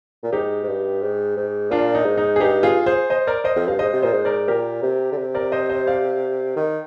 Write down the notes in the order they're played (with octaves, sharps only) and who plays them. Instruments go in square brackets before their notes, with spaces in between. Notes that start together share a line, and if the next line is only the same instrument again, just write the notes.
[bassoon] A#2
[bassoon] G#2 [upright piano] D#4 G4
[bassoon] G#2
G2
G#2
G#2
[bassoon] A#2 [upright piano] D4 F4
[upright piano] D#4
[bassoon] G#2
[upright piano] D#4
G#4
[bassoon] G2 [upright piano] D#4 G4
[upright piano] F4 G#4
G#4 C5
C5 D#5
A#4 D5
C5 D#5
[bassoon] F2
[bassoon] G2 [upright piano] F5
[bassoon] G#2 [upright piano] C5 D#5
[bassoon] C3
[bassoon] A#2 [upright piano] C5 D#5
[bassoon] G#2
[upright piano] A#4 D5
[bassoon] A#2 [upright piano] G4 A#4
[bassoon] C3
D3
C3
[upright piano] A#4 D5
C5 D#5
C5 D#5
D5 F5
[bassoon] D#3